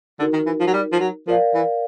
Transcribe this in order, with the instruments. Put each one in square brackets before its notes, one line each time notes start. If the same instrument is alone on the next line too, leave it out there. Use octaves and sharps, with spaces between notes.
[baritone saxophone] D3 [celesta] D#4 F#4 A#4
[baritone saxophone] D#3
E3
F3
F#3
G3
F3
F#3
[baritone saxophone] F3 [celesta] A#4 D5 F5
[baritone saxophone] E3